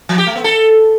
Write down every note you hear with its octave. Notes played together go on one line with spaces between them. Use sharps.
F3
G4
A3
B3
A4